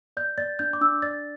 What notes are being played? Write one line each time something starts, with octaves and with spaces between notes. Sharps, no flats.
D5 G6
D5 A6
D4 G6
D6
D4 E6
D5 A6